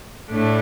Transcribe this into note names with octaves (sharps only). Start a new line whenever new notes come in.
A2 A3 D4